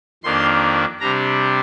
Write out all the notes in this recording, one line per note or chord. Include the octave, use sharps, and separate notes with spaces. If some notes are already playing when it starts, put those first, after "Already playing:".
F2 D#3 A#3 D4 C6
C3 G3 D4 A#5